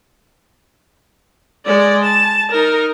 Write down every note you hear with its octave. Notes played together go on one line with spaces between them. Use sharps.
G#3 D5
A5
D#4 A#4